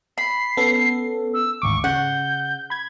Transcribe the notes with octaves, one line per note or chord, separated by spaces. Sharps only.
B5 C7
B3 C#4 A4
E6
G#1 D2 C#6 D6
C#3 F#5 G6
B5 G#6